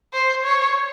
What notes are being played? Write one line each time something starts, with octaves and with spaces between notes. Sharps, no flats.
C5
C#5